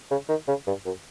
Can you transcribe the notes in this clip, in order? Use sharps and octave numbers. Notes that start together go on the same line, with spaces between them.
C#3
D#3
C#3
G2
F#2